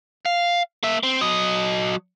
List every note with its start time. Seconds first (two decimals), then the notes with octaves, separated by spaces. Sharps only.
0.26 F5
0.83 A#3 E5
1.03 C4
1.21 F#3 D#5